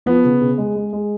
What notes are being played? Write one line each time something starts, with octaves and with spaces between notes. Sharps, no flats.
F3 B3
C#3
C#3
G#3
G#3
G#3